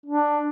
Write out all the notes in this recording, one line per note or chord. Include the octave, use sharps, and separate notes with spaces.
D4